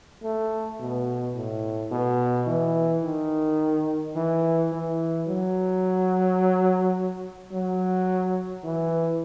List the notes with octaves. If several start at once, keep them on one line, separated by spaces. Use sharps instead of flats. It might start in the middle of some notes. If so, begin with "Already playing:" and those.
A3
B2
A2
B2
E3
D#3
E3
E3
F#3
F#3
E3